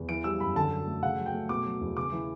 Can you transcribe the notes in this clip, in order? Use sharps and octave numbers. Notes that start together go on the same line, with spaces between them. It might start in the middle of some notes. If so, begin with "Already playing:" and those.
Already playing: E2
E3 D7
G3 E6
F#2 B5
D3 A5
F#3
A3
C#3 F#5
F#3
G5
A3
B2 D6
F#3
E2
C#3 D6
E3